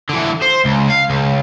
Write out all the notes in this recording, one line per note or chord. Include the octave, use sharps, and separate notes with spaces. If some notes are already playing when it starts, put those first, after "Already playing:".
D3 E3
C5
C#2
F5
C#2